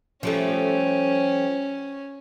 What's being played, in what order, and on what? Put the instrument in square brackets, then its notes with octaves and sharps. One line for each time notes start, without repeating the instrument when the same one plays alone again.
[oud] F3 G3 A3 [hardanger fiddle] C#4